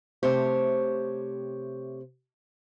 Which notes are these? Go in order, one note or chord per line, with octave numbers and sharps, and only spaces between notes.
C3 A3 G4 C5 C#5